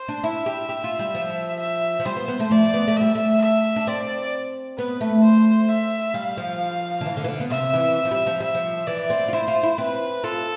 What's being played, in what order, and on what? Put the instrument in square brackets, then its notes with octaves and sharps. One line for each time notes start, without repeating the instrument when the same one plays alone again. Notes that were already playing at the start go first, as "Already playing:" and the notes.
Already playing: [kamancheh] C5
[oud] D4
[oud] E4 [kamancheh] E5
[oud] G4
G4
F4
G3
F3
[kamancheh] E5
[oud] F3
[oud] G3 [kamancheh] C5
[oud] B3
B3
A3
[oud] F3 [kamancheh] D5
[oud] B3
A3
[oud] G3 [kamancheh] E5
[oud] A3
[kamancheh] E5
[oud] D4
[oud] C4 [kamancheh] D5
[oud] B3 [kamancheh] B4
[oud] A3
[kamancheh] C5
E5
[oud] G3 [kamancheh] F5
[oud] F3
D3
E3
D3
E3
D3
B3
[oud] C3 [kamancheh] E5
[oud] E3
F3
G3
F3
[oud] G3 [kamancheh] E5
[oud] F3
[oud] E3 [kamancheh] D5
[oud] C4
F4
[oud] E4 [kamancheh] C5
[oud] F4
E4
[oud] C4 [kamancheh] B4
[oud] F4 [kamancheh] A4